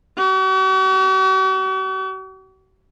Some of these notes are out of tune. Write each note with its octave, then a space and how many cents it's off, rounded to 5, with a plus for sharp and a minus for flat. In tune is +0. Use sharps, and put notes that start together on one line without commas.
F#4 +45